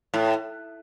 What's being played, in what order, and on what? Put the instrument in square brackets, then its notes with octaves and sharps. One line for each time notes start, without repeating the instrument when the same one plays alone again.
[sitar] A2